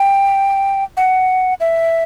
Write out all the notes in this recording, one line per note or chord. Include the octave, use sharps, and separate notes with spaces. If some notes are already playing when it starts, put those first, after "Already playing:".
Already playing: G5
F#5
E5